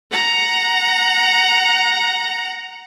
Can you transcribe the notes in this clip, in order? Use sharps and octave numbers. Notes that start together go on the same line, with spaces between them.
F#5 A#5